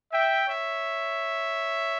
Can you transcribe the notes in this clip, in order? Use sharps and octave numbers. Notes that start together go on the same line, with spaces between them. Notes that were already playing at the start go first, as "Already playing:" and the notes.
E5 G5
C#5 E5